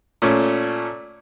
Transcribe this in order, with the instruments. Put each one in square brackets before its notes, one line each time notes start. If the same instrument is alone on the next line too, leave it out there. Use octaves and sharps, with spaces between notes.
[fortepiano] A#2 A3 C#4